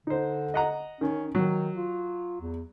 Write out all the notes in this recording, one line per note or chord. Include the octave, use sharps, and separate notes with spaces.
D3 D#4 C5
D#5 F#5 A#5
D#3 C#4
D#3 F#3
F4
E2